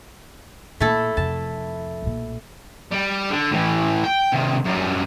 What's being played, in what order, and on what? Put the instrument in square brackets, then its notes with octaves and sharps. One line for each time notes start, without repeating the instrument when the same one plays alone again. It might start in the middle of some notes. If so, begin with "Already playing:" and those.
[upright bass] A#2 [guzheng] A3 E4 A4
[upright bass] F2 C3 [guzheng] A5
[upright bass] B1 A#2
[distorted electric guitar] G3
D3
A2 E3
G5
C3 D#3
F#2 G3